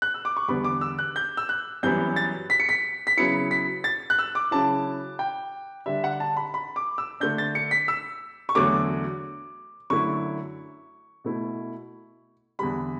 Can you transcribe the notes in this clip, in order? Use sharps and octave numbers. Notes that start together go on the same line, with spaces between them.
F#6
E6
D6
C#6
E2 D3 G3 B3 B5
D6
E6
F#6
G6
E6
F#6
F#2 E3 G3 B3 G6
A6
B6
C#7
B6
B6
C#3 F#3 B3 E4 C#7
B6
A6
F#6
E6
D6
C#3 F#3 C#4 E4 A5
G5
D3 G3 D4 E5
F#5
A5
B5
B5
D6
E6
D3 A3 D4 G6
A6
C#7
B6
E6
C#6
E2 D3 F#3 A3 D6
F#2 D3 A3 E4 C#6
B2 A3 E4
E2 D3 G3 B5